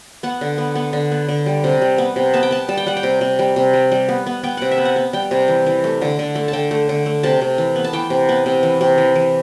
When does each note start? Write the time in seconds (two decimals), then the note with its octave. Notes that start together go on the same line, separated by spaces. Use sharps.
0.23 B3 F#5
0.41 D3
0.58 B3
0.75 B3
0.93 D3
1.12 B3
1.28 D3
1.46 G3
1.64 C3
1.82 G3
1.98 B3
2.16 C3
2.34 B3 A5
2.43 G5
2.51 B3 A5
2.68 G3 A5
2.77 G5
2.86 G3 F#5
2.97 G5
3.03 C3
3.21 C3
3.39 G3
3.56 C3
3.73 G3
3.92 G3
4.09 B3
4.26 B3
4.43 B3 G5
4.57 C3 F#5
4.71 E5
4.78 B3
4.85 F#5
4.96 B3
5.13 G3 G5
5.31 C3
5.48 E3
5.66 E3
5.84 A3
6.01 D3
6.19 D3
6.35 A3
6.48 A5
6.53 D3 G5
6.71 A3
6.89 D3
7.06 A3
7.23 C3 A5
7.42 C3
7.58 E3
7.76 B3
7.84 A5
7.93 E3 G5
8.10 C3
8.29 B3
8.46 C3
8.63 E3
8.81 C3
8.98 E3
9.16 E3